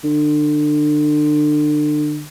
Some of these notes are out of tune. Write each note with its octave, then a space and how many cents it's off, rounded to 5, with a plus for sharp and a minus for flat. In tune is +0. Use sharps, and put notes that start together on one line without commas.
D3 +30